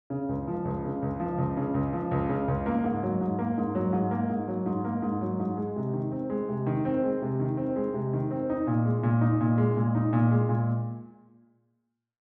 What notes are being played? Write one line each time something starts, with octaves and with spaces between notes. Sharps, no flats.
C#3
C#2
F3
C#2
C#3
C#2
F3
C#2
C#3
C#2
F3
C#2
C#3
C#2
A#3
G#2
F#3
G#2
A#3
G#2
F#3
G#2
A#3
G#2
F#3
G#2
A#3
G#2
F#3
G#2
G#3
C3
D#3
C4
G#3
C3
D#3
C4
G#3
C3
D#3
C4
G#3
C3
D#3
C4
D#4
A#2
G#3
A#2
D#4
A#2
G#3
A#2
D#4
A#2
G#3
A#2